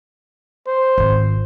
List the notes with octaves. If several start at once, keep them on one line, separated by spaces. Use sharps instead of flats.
C5
G#1 F4